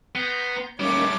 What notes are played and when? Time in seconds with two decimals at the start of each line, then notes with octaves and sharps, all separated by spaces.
0.15 B3 A#5 C6 G6
0.80 G3 A3 A#3 C#4 D#4 C#5 D6